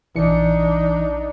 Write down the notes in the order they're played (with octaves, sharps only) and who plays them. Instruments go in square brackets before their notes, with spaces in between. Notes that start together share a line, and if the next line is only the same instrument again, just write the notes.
[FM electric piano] A#1 C#7 [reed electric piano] E3 [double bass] D4 D#4